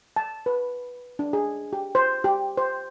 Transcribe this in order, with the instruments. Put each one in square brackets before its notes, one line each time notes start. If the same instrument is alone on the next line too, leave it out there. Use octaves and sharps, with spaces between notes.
[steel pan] A5
B4
D4
G#4
G4
C5
G4
C5